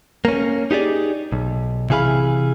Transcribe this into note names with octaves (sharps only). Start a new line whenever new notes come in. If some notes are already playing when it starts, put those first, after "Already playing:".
A#3 C#4
D#4 G4 G#4 D5
B1
C3 E3 G#4 F5 B5